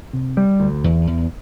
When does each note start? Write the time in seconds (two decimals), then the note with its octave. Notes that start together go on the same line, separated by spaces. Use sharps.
0.13 C3
0.37 G3
0.60 D2
0.84 E2
1.07 E2